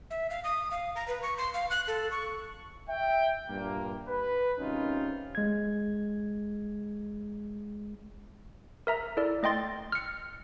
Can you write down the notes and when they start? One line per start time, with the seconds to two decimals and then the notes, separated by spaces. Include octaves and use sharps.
0.11 E5
0.30 F5
0.44 D#6
0.71 F5
0.96 A#5
1.08 B4
1.22 C#6
1.38 C6
1.54 F5
1.70 F#6
1.88 A4
2.11 C#6
2.88 E5 G5
3.49 G2 A#2 A#3
4.08 B4
4.59 G#1 C3 D#3 C#4 D#4 F4
5.35 G#3 G#6
8.87 A#4 E5 A#5
9.17 E4 A4 D5
9.43 A3 D#5 G5 C6 A6
9.92 F6 C#7